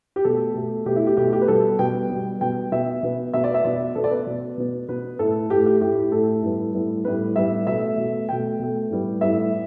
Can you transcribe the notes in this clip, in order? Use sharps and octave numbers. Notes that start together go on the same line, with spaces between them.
G4
B2 A3 A4
B2 A3
B2 A3 G4
E4
G4
B2 A3 G4
G4
B4
B2 G3 B3 A4
B2 G3 B3 G5
B2 G3 B3
B2 G3 B3 G5
B2 B3 E5
B2 B3
B2 B3 E5
D5
E5
B2 B3 D5
B2 B3 A4
D5
B4
B2 B3
B2 B3
B2 B3 B4
A2 A3 A4
A2 A3 G4
G4
A2 A3 G4
A2 A3 A4
A2 G3 B3
A2 G3 B3
A2 G3 B3 B4
A2 G3 B3 E5
B2 A3 E5
B2 A3
B2 A3 G5
B2 A3
A2 G3 B3
A2 G3 B3 E5